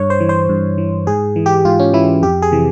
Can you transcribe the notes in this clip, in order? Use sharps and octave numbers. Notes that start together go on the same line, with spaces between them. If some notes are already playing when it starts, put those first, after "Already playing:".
Already playing: G2 C#5
C5
E3
C5
G2
E3
G#2 G#4
E3
G4
G#2 F4
C#4
E3 E4
F2 G4
G#4
C3 E3